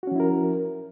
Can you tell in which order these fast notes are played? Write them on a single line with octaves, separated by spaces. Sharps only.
F#4 C#4 F3 E4 A#4